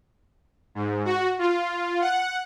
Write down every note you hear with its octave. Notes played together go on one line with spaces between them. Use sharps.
G#2
F#4
F4
F#5